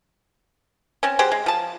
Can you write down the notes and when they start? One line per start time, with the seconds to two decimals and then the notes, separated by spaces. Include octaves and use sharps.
1.03 C4 C#4
1.19 F#3 G4 G#4 C5
1.32 G#3
1.46 F3 A5